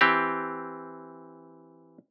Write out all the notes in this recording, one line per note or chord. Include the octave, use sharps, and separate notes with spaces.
E3 C4 G4